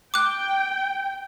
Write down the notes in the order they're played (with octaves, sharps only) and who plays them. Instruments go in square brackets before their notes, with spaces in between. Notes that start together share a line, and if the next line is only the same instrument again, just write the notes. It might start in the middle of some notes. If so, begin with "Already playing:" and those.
[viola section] G5 [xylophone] D6 F#6